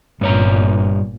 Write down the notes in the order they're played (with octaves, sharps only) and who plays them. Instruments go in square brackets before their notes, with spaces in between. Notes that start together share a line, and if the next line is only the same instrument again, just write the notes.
[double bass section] G1 A#2 [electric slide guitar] G2 C#5 A#5